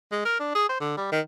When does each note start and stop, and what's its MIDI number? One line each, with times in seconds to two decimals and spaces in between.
0.12 0.20 56
0.25 0.35 70
0.40 0.51 62
0.55 0.68 68
0.69 0.77 72
0.81 0.96 50
0.97 1.09 55
1.12 1.21 51